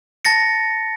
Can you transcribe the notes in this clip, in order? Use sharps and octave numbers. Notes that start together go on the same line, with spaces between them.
A5 A6 A#6 C#7